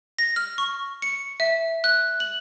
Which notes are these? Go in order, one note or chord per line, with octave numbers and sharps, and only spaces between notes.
A#6
F6
C#6
C#7
E5
F#6
F#7